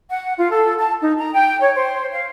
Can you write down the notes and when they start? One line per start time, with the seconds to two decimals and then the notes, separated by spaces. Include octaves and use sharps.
0.10 F#5
0.37 F4
0.52 A4
0.78 A5
1.02 D#4
1.18 A#5
1.33 G5
1.60 C#5
1.75 C5
2.11 F5